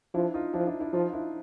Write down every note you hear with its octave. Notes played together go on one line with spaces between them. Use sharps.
F3 D4 E4
D#4 F4
F3 D4 E4
D4 E4
D4 E4
F3 D#4 F4
D4 E4